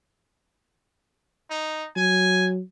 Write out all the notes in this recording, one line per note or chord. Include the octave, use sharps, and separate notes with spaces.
D#4
F#3 G#5